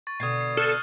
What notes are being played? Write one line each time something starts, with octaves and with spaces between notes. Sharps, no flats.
C#6 A6
B2 D3 D#6 G#6 C7
C7
A4 F6 F#6 D#7